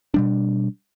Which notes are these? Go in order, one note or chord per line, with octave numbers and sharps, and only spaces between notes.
B2 G3 D4